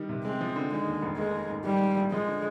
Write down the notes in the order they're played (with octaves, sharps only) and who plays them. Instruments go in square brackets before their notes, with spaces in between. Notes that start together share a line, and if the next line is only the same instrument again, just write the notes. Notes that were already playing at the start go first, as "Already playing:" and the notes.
Already playing: [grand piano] D#3 G3
C3
[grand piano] G#3 [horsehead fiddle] C4
[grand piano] F3
D3
[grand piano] D#3 [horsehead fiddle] G#3
[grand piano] D#2
F1
[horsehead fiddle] G#3 [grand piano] A#3
[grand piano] D#3
G#2
[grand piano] D#3 [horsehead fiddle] G3
[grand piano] G#2
A#1
[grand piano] F3 [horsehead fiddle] G#3
[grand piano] D3